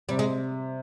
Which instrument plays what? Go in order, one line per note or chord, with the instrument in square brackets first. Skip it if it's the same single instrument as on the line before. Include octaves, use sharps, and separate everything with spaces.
[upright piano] C3 [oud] G3
[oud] G#3